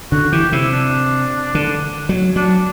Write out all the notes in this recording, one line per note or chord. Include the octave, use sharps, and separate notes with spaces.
D3 F#4
E3 G4
C3 E4
D4
D3
F#3
F#3 D4